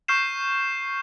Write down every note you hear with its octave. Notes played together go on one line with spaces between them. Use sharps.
C#6 F6 G6 C7 E7